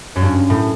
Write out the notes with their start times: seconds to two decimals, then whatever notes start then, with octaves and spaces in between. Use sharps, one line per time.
0.16 F#2
0.22 G2
0.50 A2